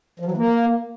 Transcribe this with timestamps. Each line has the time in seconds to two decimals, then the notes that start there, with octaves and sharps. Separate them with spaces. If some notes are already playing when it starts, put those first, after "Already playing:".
0.20 F3
0.25 F#3
0.31 E3
0.37 A#3